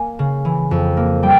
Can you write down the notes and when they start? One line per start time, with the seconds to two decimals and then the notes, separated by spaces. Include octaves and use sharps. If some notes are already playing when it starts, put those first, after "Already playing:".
Already playing: A#3 G#5
0.19 C#3
0.45 E3
0.71 F2
0.97 A#3
1.23 G3 G5